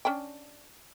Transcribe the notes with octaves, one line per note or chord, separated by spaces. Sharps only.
C#4 D4 G5